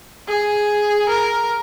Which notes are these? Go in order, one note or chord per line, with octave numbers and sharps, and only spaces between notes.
G#4
A#4